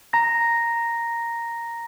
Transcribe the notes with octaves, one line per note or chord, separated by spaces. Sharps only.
A#5 A#6